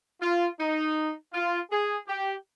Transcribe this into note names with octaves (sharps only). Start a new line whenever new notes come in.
F4
D#4
F4
G#4
G4